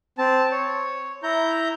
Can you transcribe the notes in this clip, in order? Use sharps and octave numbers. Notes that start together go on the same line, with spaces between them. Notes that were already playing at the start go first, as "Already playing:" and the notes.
C4 A5
C#5
E4 A#5 G6